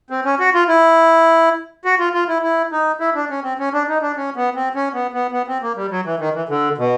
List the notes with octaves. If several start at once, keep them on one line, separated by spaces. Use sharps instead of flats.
C4
C#4
F#4
F4
E4
F#4
F4
F4
E4
E4
D#4
E4
D4
C#4
C4
C#4
D4
D#4
D4
C#4
B3
C4
C#4
B3
B3
B3
C4
A#3
G3
F#3
E3
D#3
E3
D3
B2